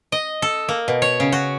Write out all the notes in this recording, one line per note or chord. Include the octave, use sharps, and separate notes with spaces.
D#5
A4
A#3
B2
C#5
C#3
F#4